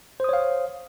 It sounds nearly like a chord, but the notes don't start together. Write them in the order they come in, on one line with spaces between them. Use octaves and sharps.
C5 D#6 C#5 F5